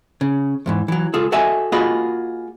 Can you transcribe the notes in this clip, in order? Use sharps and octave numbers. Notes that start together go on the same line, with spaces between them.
C#3
E2 G#2 E3
E3 F#3
C#2 F4 G#4 A4
F#4 G#4 A4 D#5 E5 G#5
A#3 F4 F#4 G#4 D#5 B5